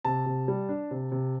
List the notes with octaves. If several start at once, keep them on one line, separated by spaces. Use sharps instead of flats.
C3 A5
C3
G3
D4
C3
C3